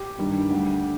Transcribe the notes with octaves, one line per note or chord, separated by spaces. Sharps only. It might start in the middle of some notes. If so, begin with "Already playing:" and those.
Already playing: G4
G2 D#3 G3 D4
D2 D3 G3